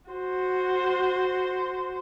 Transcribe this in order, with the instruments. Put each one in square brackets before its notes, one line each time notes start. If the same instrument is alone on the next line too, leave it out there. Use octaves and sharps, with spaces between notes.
[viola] F#4 C5